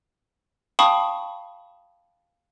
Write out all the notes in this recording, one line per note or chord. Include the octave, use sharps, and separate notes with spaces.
F5 G5 A5 B5 C#6 D#6